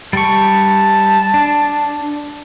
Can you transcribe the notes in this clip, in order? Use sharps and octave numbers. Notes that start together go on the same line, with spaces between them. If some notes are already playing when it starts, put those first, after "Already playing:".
G3 A5 C#6
D4